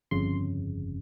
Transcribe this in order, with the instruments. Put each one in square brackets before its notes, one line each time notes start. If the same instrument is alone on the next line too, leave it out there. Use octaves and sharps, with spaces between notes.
[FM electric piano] G1 F2 C#3 C6